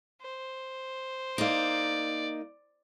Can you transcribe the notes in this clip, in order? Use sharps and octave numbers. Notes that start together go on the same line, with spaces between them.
C5
A#3 D#4 D5